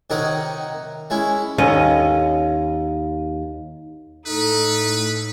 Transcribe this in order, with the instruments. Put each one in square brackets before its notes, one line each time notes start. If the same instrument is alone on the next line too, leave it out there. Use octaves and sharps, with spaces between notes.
[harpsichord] C3 D#3 D#4 A#4 C#5 F#5
G#3 C#4 E4
[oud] D#2 C#4 D#5
[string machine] A2 [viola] D#4 A4 [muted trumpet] B4